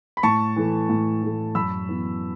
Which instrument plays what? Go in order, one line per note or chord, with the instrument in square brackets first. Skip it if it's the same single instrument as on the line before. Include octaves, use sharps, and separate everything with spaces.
[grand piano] B5
A2 A5 C#6
E3 A3
A2
E3 A3
F#2 B5 E6
E3 B3